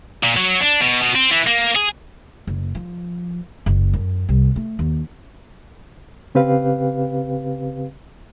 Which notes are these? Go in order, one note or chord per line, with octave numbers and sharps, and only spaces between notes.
A#2
F#3
D4
B2
B2
C4
E3
A#3
G#4
F#1
F3
F#1
F#2
C2
A3
D#2
C#3 C4 G4 B4 F5